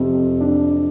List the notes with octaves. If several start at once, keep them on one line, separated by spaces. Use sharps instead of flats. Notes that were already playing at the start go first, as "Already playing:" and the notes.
Already playing: F2 C3
D4